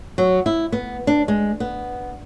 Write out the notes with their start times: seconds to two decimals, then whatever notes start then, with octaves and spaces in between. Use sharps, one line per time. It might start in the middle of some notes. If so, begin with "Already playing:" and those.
0.18 F#3
0.46 E4
0.72 B3
1.07 D4
1.28 G#3
1.60 B3